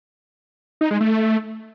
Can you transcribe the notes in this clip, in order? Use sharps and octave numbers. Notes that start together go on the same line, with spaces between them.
D#4
G#3
A3